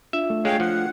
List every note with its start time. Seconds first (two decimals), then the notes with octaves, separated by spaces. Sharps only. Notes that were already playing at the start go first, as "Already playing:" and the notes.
0.13 D4 F4 E5
0.30 A3
0.45 G#3 C#5 F5 G5
0.60 F3 F#5